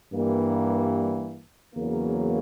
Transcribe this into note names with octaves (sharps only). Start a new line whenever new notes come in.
G2 E3 G3 A#3
E2 C#3 F#3 A#3